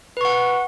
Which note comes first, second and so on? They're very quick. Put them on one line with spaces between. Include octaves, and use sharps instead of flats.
B4 C#6 F#5